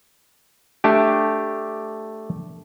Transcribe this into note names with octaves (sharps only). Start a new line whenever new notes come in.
A3 D4 G4